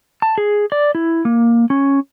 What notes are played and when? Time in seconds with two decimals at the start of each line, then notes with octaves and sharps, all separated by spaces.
0.22 A5
0.38 G#4
0.72 D5
0.95 E4
1.25 A#3
1.70 C#4